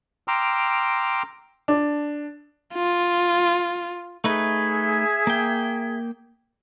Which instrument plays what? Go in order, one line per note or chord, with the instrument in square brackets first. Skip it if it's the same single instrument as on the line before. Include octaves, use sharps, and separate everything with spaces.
[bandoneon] G5 A#5 C6 D6 E6 F6
[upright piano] D4
[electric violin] F4
[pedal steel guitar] A3 D#4 B4 [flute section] G#4 E5 G#6
[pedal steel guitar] A#3 G5